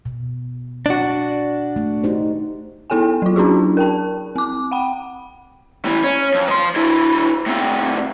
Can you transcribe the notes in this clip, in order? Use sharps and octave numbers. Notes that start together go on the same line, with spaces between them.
B2
D4 F#4
A3
D#4 G4 C5
B3 E4 A4 G5 G#5
F#3 F4
C#4 D4 E4 F#4 G#4
A#4 G5 A5
C4 D6
F#5 G5 B5
A2 E3
C#4
F2
F3 C6
D3 E4
A2 C4